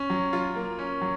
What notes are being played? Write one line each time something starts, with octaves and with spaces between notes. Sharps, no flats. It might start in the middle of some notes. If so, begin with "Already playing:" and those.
Already playing: C#4
F#3
F4
A#3
C#4
F#3